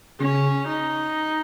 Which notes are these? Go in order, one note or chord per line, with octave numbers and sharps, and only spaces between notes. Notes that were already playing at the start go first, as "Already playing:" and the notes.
C#3 C#4
D#4